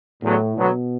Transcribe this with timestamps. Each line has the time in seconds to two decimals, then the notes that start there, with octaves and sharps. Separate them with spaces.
0.23 E2 A2 D3 F#3 B3
0.55 D2 B2 D3 F#3 B3